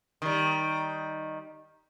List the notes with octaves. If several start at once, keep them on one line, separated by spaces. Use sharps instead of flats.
D#3 G3